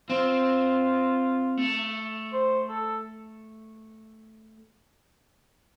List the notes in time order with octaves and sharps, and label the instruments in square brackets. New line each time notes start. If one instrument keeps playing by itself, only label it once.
[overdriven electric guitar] C4 [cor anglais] F4
[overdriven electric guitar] A3
[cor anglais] C5
A4